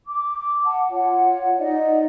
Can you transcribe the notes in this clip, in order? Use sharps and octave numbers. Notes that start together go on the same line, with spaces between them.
D6
F#5 A5
F4 C#5 F#5
D#4 D5 D#5